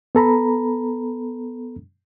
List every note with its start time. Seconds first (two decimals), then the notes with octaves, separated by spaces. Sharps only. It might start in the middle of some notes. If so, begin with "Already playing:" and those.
0.15 B3 A4 A#5 B5